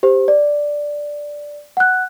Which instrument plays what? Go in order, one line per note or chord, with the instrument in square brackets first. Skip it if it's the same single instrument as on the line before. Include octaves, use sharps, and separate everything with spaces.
[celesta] G4 C5
D5
F#5 F#6